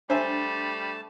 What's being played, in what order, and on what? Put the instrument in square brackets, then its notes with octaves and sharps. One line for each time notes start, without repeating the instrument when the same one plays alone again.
[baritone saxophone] G3 [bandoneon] A3 A5 [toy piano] D4 [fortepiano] C5 E5 G#5